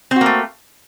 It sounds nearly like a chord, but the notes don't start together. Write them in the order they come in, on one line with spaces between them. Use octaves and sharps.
C4 F#4 A#3 A3